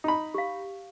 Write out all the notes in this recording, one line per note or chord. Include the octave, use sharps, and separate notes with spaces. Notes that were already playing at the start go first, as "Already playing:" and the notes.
D#4 B5
G4 F5